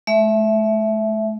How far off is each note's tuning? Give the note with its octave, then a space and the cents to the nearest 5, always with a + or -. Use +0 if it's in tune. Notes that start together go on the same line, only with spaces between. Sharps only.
A3 -35 E5 +0